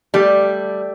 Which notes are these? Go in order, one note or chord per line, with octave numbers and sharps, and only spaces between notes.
G3 A3 G4